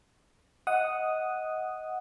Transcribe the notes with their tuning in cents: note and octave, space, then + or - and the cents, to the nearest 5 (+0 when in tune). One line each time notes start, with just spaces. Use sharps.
D#5 +20 F#5 +0 D#6 +0